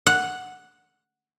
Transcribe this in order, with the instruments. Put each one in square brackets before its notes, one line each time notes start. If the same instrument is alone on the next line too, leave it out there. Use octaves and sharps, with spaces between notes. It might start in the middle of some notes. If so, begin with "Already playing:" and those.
[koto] F#5